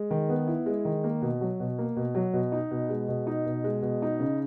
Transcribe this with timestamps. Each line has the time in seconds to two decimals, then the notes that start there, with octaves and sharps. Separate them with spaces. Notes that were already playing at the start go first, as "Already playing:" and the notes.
Already playing: G#3
0.11 D#3
0.29 B3
0.47 E4
0.66 G#3
0.85 D#3
1.04 A#3
1.22 B2
1.41 F#3
1.60 B2
1.79 A#3
1.96 B2
2.15 F#3
2.33 B2
2.52 D#4
2.71 B2
2.89 G#3
3.08 B2
3.27 D#4
3.46 B2
3.64 G#3
3.82 B2
4.02 D#4
4.20 C#3